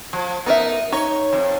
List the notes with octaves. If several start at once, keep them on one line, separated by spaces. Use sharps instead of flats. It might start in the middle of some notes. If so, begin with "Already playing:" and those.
F3
B3 D#4 A#4 E5
D#4 C#5
F2